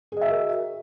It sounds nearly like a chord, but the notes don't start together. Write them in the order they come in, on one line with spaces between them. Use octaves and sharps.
G#4 D#5 E5 F#4 A#4